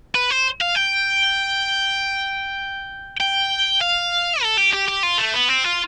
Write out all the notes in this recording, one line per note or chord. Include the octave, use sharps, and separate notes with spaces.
B4
C5
F5
G5
G5
F5
A4
G4
G4
G4
F4
A3
B3
C4
F4